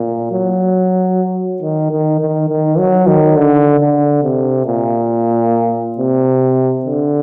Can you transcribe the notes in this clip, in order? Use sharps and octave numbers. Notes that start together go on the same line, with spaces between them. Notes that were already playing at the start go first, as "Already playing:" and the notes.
Already playing: A#2
F#3
D#3
D#3
D#3
D#3
F#3
D#3
D3
D3
C3
A#2
C3
D3